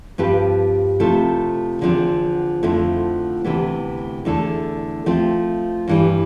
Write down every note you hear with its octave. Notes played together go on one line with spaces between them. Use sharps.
G2 F3 C4 G4 B4
C3 F3 A3 E4 A4
E2 D3 F3 C4
F2 D3 F3 A3 E4
D2 C3 E3 B3
E2 D3 A3 E4 A4
F3 A3 C4 F4
G2 E3 G3